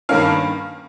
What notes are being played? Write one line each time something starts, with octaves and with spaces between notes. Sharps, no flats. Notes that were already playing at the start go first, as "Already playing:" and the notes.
G2 D#3 A#3 C#4 F5